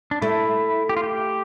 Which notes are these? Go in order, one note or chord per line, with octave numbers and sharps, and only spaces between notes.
D4
A3 E4
G4
F4
G4